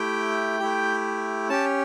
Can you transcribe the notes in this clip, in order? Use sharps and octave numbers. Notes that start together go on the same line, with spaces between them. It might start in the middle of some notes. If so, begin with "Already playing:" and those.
Already playing: A3 E4 G4 G5
A3 E4 G4
C#4 G4 A5